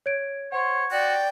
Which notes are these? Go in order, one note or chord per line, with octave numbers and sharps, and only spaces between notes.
C#5 G#6 D7
C5 C#5 F#5
F#4 D5 G5